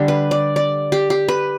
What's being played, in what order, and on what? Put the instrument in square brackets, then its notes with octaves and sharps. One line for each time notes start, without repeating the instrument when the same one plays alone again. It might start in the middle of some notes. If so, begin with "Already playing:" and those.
Already playing: [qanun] D3 G3 D4 G4
B4
D5
D5
G4
G4
B4